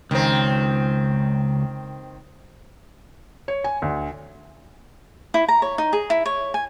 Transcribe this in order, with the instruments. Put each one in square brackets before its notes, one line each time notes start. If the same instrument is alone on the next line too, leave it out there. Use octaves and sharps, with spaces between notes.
[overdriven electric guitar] C#2 [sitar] D#3 C4
[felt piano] C#5
G#5
D2
[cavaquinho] E4
A#5
C#5
D#4
G#4
E4
C#5
G#5